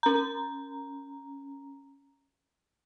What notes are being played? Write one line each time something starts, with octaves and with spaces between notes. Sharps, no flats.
C#4 A#5